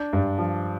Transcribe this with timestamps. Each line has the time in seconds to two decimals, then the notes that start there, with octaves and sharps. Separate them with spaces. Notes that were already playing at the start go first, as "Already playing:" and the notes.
Already playing: D4 G6
0.13 G2
0.38 F3